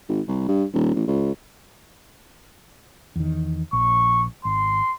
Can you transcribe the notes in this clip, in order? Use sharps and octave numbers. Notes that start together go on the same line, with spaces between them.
G#1
C2
G2
D#1
A1
C#2
E2 D#3
A#1 C#6
G#1 C6